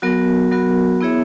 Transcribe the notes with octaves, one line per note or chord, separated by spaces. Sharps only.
F#3 B3 F#4 A#4
F#3 B3 F#4 A#4
B3 E4 G#4 C#5 E5